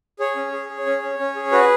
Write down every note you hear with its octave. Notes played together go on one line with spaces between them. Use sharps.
G#4 C#5
C#4
G#4
G#4
C#4
C#4
C#4
G#4
F#4 B4